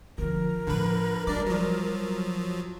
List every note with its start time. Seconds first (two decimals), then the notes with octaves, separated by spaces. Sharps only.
0.18 D3 F3 A#4
0.67 A2 D3 F3 B4
1.27 B1 G3 D4 D5
1.47 F3 F#3